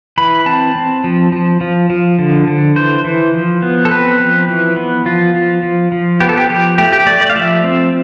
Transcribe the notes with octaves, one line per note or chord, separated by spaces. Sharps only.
E3 B5
C4 A5
C4
F3
F3
F3
F3
D3
D3
E3 C5
E3
F3
B3
A4
C4 B4
F3
E3
B3
F3 F4
F3
F3
F3
B3 G4
A4
G4
F3 G4
A3 G4
G4
A3 D5
D5
F5
F3 E5
C4